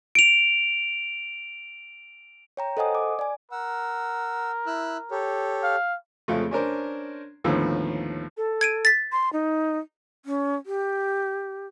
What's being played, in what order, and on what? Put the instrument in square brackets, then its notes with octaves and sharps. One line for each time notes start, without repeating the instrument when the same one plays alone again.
[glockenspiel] D7 F7
[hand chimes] C#5 G5 A#5
A4 C5 D#5 F#5 G#5 D#6
D6
D5 G#5
[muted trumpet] A#4 [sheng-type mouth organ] F#5 E6
[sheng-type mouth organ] E4 E6 F#6
G4 A4 C#5
[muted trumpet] F5
[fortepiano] F2 C#3 F3 G#3 A3
C#4 D4 A#4 C5
D#2 A2 D3 F3 B3 E6
[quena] A4
[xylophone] G#6 D7 D#7
A6 B6
[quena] C6
D#4
[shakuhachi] C#4
G4